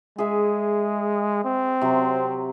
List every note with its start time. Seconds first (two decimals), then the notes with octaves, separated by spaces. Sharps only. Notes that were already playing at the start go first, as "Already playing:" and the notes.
0.18 G#3 G#4 E5
1.45 C4
1.81 C3 F#3